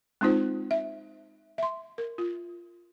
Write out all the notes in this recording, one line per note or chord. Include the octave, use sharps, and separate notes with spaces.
G#3 C4 D#4 F4 C5
E5
E5 C6
A#4
F4